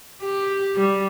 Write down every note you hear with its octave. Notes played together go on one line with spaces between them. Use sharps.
G4
G3